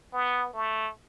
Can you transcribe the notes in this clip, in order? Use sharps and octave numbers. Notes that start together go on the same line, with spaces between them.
B3
A3